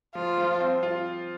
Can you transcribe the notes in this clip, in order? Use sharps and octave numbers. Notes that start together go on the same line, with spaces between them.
F3 F4
F3
C4
F4